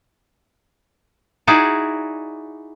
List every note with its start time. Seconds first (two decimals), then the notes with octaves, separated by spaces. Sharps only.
1.47 D#4 E4 F#4 G#4 D5